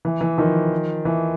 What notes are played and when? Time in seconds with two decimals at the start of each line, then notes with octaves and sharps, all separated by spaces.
0.05 E3
0.21 E3
0.38 D#3 F3
1.05 E3